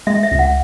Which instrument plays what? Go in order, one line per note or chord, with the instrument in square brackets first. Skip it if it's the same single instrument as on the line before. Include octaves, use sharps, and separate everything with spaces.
[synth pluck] G#3 [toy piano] E5
[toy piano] E5
[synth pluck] C#2
[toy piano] F#5